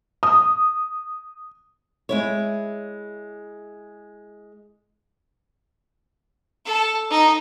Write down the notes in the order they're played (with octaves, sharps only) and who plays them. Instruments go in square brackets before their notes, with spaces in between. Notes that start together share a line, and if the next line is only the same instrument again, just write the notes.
[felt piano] D#6
[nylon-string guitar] G#3 E4 C#5
[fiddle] A4
D#4